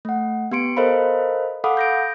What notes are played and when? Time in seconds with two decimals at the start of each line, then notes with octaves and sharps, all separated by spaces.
0.05 A3 F#5
0.51 B3 G4 C6 C#7 D7
0.77 A4 A#4 C5 D#5 F5 B5
1.64 A4 F5 F#5 B5 D6 D#6
1.77 G6 A#6 D7